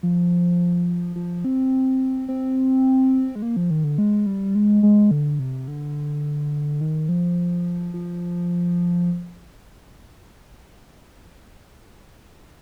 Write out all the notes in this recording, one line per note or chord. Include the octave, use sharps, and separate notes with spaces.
F3
F3
C4
C4
G#3
A#3
F3
D#3
D3
G#3
G3
G#3
G#3
D3
C3
D3
D#3
F3
F3